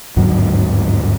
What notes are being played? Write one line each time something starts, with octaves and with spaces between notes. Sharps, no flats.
G1 D#2 G#2 F#3